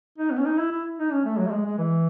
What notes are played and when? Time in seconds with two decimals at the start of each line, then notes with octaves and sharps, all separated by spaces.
0.18 D#4
0.32 B3
0.39 C#4
0.45 D#4
0.58 E4
0.71 E4
0.99 D#4
1.12 C#4
1.25 A3
1.39 F#3
1.47 A3
1.52 G#3
1.66 G#3
1.79 E3